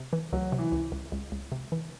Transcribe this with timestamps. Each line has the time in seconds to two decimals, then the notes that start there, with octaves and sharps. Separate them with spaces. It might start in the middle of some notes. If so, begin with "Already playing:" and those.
Already playing: C3
0.13 E3
0.33 C#2 F#3
0.52 C3
0.58 E3
0.72 C#2
0.92 C#2
1.12 C#2
1.32 C#2
1.52 C3
1.72 E3